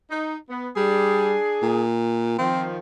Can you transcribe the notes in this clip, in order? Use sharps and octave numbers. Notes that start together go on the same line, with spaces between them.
D#4
B3
G3 D4 G#4
A#2
D#3 F3 C4